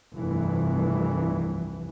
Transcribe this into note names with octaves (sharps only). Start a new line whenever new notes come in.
F1 C2 G2 E3